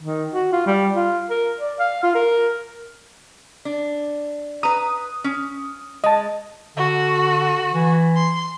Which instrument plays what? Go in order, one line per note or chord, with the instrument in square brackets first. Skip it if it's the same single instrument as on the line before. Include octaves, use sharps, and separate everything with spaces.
[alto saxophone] D#3
F#4
F4
G3
F4
A#4
D5
F5
F4
A#4
[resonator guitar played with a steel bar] D4
[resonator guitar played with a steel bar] B4 A#5 [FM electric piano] D#6
[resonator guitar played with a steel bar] C#4
[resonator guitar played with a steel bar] G#3 [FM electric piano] D#5 A5
[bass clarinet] D3 [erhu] F#4
[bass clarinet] E3
[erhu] C6